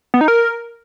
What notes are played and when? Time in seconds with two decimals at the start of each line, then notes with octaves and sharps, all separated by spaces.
0.14 B3
0.21 D#4
0.28 A#4